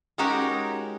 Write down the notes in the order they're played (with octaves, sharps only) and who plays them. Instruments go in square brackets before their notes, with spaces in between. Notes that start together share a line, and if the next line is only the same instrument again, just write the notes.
[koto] G#3 C#4 D#4 F#4 G4 A#4